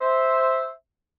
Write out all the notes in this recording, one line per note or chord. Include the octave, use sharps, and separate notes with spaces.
C5 E5